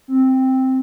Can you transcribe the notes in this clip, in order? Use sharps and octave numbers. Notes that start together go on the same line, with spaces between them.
C4